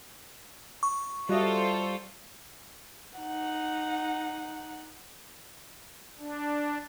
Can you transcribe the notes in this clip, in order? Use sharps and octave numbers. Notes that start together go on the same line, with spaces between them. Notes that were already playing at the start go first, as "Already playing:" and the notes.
C#6
G3 F4 F#4 A4 C5 D#5 E5
D#4 F#5
D4